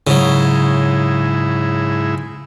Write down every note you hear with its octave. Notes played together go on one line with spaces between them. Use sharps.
G#2 C#3 F#3 E4